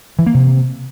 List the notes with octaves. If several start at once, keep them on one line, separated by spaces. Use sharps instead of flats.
E3
A#3
C3